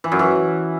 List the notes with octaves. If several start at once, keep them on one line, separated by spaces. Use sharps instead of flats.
E3
F#2
E3